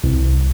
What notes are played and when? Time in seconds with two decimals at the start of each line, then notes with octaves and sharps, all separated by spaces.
0.04 C2